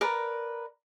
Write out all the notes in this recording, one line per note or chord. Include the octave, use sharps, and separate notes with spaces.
A#4 B4 D5 A#5